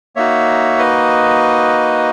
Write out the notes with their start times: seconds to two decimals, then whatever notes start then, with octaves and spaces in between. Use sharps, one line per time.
0.16 A#3 D#4 F#4 C#5 E5
0.78 B4 D#5